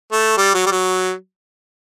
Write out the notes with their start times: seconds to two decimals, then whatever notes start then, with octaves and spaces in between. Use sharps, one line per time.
0.12 A3
0.37 G3
0.54 F#3
0.66 G3
0.71 F#3